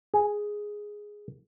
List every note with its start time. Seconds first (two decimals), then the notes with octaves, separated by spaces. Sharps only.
0.14 G#4